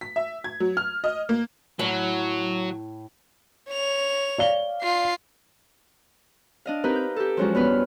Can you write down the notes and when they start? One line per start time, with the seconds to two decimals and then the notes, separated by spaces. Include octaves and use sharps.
0.01 B6
0.16 E5
0.44 G#6
0.60 F#3
0.77 F6
1.04 D#5
1.29 A#3
1.79 A2 F#3
3.71 C#5 F7
4.38 D5 F5 G7
4.82 F4 C7
6.66 D4 D#5 F5
6.84 C4 D#4 G4 A#4 B4
6.95 G6
7.16 G4 A4
7.37 F3 F#3 G#3 C#4 F4 F#4
7.55 G2 B3 B4 F6